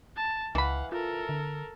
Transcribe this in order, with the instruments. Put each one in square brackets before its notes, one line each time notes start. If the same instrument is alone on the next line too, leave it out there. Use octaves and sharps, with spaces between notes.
[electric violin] A5
[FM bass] C#2 [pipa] E3 B5 [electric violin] F5 F#5
[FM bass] F4 [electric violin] A4 A#4
[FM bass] D3